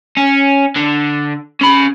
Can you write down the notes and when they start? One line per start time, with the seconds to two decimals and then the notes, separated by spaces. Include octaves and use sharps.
0.17 C#4
0.76 D3
1.61 C#4 B5